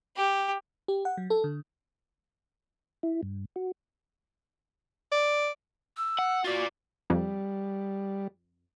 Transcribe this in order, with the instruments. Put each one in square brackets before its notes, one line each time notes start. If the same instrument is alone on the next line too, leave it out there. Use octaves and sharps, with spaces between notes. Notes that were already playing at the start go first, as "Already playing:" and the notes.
[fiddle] G4
[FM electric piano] G4
F#5
F#3
A4
D3
[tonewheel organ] E4
G2
F#4
[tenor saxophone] D5
[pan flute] E6
[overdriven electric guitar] F#5
[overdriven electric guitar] F4 D5 [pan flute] F#4
[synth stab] F2 [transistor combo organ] G3